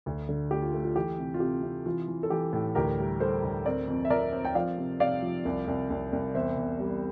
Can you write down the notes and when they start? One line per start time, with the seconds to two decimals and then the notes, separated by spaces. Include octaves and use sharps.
0.06 D2
0.29 D3
0.51 A3 G4
0.62 F4
0.74 A3
0.84 F4
0.96 E3 G4
1.18 C3
1.34 F4
1.40 C3 G4
1.63 C3
1.86 E3 F4
2.08 E3
2.23 A4
2.30 E3 G4
2.53 A2
2.75 D2 G4 A#4
2.98 G3
3.20 G3 A4 C5
3.43 D2
3.65 C4 A#4 D5
3.88 F2
4.05 E5
4.10 F2 A#4 D5
4.33 C4
4.45 G5
4.55 F3 D5 F5
4.78 C3
5.00 C3 D5 F5
5.22 F3
5.45 C2
5.68 C2
5.90 C2
6.13 C2
6.35 E2 C5 E5
6.57 E2
6.80 G3